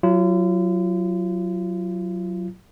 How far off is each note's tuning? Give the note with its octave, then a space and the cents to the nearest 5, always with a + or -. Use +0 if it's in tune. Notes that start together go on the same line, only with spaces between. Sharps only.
F#3 +0 F4 -40